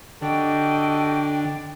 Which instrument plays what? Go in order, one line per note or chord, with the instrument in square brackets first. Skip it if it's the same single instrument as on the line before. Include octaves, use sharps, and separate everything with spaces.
[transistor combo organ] D3 [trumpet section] F#4 G4 D#5 [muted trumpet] A4 [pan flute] G5